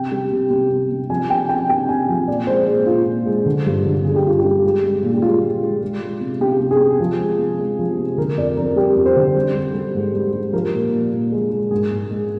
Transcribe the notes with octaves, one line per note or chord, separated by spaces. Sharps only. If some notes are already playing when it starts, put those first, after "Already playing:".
Already playing: C3 G5
G3
C3
C3
C3
C3
F3 G#5
C3 G5
C3 G5
C3 G5
C3 G#5
F3
A#2 D5
G#3 C5
A#2 G#4
A#2 F4
A#2
G#3
D3
G2
D3
D3 G#4
G4
G2 F4
G4
G3
G#3
G#3
A#2
G4
G#3 F4
G#3
G#3
G#3
G#3
C3
C3 G4
C3
G#4
C3
F3
G#3
C3
G#3
F3
C3
D3 A#4
F2 D5
F2 A#4
G3 G4
F2
C5
D3
G3
G3
G3
G#2
G3
G3
F3 A#4
A#2
A#2
A#2
G#3
G#3
G#2 G#4
G#2
G#3